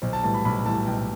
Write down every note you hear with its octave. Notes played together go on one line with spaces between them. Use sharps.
B1 C5
A5
A2 E3 G3 A5
B5
B1 B5
A2 E3 G3 A5
B1 G5